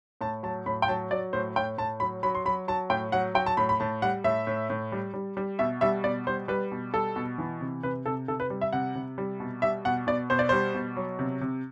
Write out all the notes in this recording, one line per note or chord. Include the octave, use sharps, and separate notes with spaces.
A2 A5
F#3 A5
A2 B5
G5
F#3 A5
F#3 D5
A2 C5
A2 G5
A2 A5
F#3 B5
F#3 B5
C6
F#3 B5
F#3 A5
A2 G5
F#3 F#5
F#3 G5
A5
A2 B5
B5
A2 A5
G3 F#5
A2 E5
A2
A2
G3
G3
G3
B2 E5
G3 E5
B2 D5
G3 C5
G3 B4
B2
G3 A4
B2
E3
C3
C3 B4
C3 A4
C3 A4
B4
G3
E5
C3 F#5
C3
G3
B2
G3 E5
B2 F#5
B2 D5
B2 C5
D5
G3 C5
B2
F#3
C3
C3